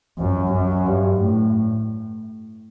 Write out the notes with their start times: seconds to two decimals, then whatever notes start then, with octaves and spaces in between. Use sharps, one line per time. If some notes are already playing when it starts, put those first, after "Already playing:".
0.18 F#2
0.53 F#2
0.86 G2
1.21 A2